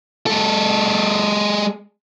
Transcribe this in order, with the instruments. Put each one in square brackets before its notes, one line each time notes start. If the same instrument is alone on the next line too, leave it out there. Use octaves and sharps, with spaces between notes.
[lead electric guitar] G#3 A4